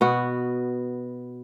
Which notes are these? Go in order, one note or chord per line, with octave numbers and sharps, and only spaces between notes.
B2 B3 F#4